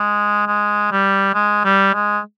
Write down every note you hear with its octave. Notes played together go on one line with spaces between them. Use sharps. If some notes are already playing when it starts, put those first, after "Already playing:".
Already playing: G#3
G#3
G3
G#3
G3
G#3